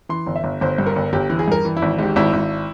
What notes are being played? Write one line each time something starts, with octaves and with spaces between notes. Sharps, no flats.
E3 C6
G1
E5
G1
G1 C5
G2
A#4
G1
G1 G4
E3
G#4
G2 A#4
E3
E4
G#1
G#2 G4
G#1 E4
G#1